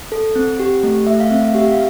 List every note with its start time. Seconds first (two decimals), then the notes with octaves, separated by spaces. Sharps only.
0.12 A4
0.36 C4
0.59 G4
0.83 A3
1.07 A3 E5
1.20 F5
1.31 C4 E5
1.45 F5
1.55 G4 E5
1.71 F5